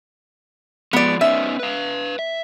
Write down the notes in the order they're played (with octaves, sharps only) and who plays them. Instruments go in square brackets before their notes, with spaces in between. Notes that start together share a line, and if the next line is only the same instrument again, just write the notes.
[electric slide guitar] F3 G#3 [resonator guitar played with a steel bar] B3 D5
[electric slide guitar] B3 C#4 D#4 [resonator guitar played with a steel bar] E5
[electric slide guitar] B4 F5
E5